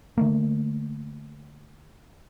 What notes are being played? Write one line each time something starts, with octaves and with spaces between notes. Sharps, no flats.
D3 A3 A#3